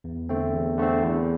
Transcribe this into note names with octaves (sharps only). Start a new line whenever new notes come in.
E2
D3 A3 C4
E2
D3 A3 C4
E2